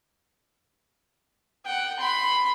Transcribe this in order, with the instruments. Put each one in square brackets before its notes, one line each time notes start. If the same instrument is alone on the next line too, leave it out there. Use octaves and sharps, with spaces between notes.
[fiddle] F#5 G5
B5 C6